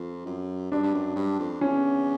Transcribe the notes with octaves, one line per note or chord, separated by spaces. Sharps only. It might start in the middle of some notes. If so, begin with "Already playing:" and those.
Already playing: F2
F#2
G2 D4
G2
F#2
G2
F2
E2 C#4